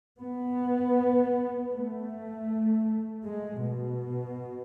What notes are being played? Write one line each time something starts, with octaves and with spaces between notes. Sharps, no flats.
B3
A3
G#3
B2